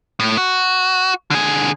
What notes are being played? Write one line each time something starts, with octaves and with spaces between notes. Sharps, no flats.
A2
F#4
D3 G#4